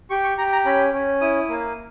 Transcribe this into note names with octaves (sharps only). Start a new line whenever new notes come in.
G4 C#6
C#6
G4 A#5
A#5
C#4 B5
C#4
E4 D#6
A#3